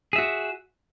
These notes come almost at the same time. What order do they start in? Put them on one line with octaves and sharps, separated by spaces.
G#4 E5 F#4